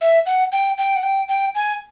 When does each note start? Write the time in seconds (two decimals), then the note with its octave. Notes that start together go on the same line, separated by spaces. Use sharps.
0.01 E5
0.26 F#5
0.52 G5
0.78 G5
0.96 F#5
1.03 G5
1.28 G5
1.55 G#5